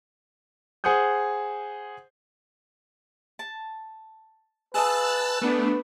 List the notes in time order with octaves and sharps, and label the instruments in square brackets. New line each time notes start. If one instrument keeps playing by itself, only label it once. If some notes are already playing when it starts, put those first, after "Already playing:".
[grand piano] G#4 C5 F#5 D#6 G6
[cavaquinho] A5
[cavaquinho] G#4 D#5 F5 [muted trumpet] B4 [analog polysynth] A5 E6 F#6
[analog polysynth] A3 B3 D4 [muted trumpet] B4